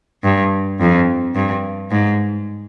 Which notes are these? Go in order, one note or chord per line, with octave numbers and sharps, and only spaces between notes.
G2
F2
G2
G#2